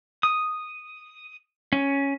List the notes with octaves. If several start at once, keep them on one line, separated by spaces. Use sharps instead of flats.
D#6
C#4